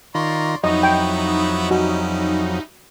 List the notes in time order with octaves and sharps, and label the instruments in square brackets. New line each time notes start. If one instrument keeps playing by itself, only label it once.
[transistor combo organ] D#3 F4 A#5 [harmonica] C#5 D5 C6
[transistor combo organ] F2 F#3 [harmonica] B3 E4 C#5 [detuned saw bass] D#4 [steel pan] D#5
[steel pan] G5
[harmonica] G3 C#4 E4 [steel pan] F#4